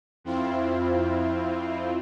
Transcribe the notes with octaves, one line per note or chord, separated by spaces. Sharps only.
F2 C4 E4 F4